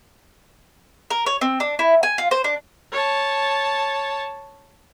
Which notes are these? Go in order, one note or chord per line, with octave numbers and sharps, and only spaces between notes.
A#4
C#5
C4
D4
E4
G#5
F4
C5
D4
C#5 A5